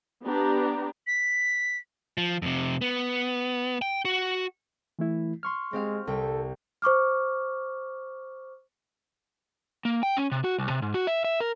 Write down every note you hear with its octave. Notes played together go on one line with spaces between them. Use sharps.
B3 D4 G4 A#5
B6
F3
F2 C3
B3
G5
F#4
E3 A3 E4
C6 C#6 F6
G#3 C4 G4 F5
C2 A4 G5
C5 C#6 D6 F6
A#3
G5
C#4
C3
F#4
C2
C3
G#2
F#4
E5
E5
A#4